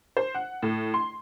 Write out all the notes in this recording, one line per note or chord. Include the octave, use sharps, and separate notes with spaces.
C5
F#5
A2
C6